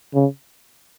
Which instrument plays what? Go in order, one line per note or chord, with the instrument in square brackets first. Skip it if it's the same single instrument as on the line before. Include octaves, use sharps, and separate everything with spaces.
[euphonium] C#3